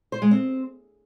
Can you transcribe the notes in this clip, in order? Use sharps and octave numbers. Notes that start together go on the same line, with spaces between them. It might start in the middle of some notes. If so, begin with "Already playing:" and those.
C5
G#3
C4